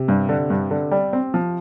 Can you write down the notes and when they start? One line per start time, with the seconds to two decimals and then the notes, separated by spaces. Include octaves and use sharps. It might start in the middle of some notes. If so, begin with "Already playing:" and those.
Already playing: C3
0.08 G2
0.29 D3
0.50 G2
0.71 D3
0.91 G3
1.13 C4
1.34 F3